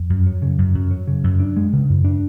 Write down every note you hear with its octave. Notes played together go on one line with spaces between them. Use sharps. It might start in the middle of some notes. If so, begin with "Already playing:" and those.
Already playing: F2
F#2
F#3
C#3
F#2
F#2
F#3
C#3
F#2
D4
G#3
C#3
F#2
D4